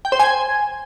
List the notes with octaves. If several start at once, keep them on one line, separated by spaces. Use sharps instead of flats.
G5
C5
G#5